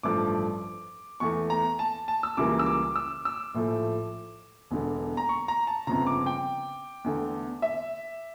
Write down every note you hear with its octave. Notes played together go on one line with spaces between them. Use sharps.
A1 G2 F3 A3 D6
E2 E3 A3 C#6
A#5
A5
A5
E6
C#2 C#3 E3 G3 A#3 D6
E6
D6
E6
E6
A#1 A2 F3 A3
E1 E2 D3
A#5
C#6
A#5
A5
G1 F2 C#3 A#5
D6
G5
E2 D3 A3
E5